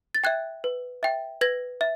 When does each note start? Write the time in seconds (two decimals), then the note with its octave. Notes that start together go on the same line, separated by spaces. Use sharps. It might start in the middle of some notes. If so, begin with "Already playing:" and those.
0.15 A6
0.24 E5 G5 F#6 G#6
0.64 B4
1.03 E5 G5
1.41 B4 G#6 A#6
1.81 E5